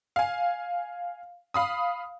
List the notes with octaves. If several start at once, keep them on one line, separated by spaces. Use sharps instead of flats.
F5 G#5
F5 B5 D#6